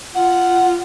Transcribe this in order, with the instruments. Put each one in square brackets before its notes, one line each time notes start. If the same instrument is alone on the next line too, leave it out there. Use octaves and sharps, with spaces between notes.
[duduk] F4 [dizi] F#5